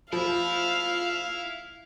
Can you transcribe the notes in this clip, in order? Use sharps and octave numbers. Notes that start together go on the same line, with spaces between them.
F3 E4 F5